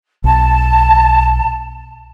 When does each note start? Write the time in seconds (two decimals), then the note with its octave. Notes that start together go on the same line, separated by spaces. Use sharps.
0.24 B1 A5